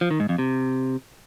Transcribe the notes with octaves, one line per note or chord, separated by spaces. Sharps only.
F3
D#3
G#2
F2
C3